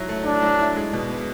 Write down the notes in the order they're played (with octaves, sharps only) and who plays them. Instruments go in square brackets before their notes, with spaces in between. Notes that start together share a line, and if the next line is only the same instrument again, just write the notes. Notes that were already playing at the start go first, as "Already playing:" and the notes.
Already playing: [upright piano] F#3 E4
A3
[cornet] D4 [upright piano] E4
[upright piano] F#3
E4
G#3
B2
B3